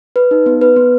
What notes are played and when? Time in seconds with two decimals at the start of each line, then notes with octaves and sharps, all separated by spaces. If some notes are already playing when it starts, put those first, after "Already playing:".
0.16 B4
0.31 D#4
0.46 B3
0.61 B4
0.76 B3